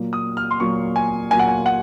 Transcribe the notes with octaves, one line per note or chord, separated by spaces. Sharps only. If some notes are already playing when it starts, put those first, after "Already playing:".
Already playing: A#2 F#3 A#3
D#6
F6
C6
A#2 F#3 A#3 C#6
G#5
A#2 F#3 A#3 G#5
F#5
G#5
F#5